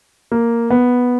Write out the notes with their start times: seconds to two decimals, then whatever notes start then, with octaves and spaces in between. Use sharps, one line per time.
0.32 A#3
0.70 B3